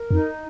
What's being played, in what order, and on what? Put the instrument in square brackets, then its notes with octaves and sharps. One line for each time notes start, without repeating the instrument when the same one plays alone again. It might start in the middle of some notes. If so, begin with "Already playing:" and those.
Already playing: [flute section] A#4
[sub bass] F2 [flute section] D#4